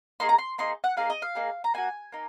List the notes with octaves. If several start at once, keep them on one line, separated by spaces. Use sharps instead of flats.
A#3 D#4 G#4 C6
A#5
C6
A#3 D#4 G#4 C6
F#5
A#3 D#4 G#4 F5
D#5
F5
A#3 D#4 G#4
A#5
A#3 D#4 F#4 G#5
A#3 D#4